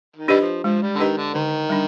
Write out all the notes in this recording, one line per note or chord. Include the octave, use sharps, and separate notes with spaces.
D#3
G3 D4 G4 B4 D#5
F3
F3 G#3
G3
D3
D#3 D4 G4 B4 D#5
D3
D3 D#3
G3 D4